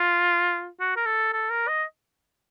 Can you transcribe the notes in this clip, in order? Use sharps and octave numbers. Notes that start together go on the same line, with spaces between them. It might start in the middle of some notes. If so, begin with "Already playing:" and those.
Already playing: F4
F#4
A#4
A4
A4
A#4
D#5